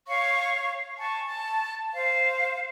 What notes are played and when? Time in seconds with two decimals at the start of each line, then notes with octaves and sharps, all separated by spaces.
0.08 C#5 F5 C#6
0.97 G#5 A5 C#6
1.26 A5
1.93 C5 F5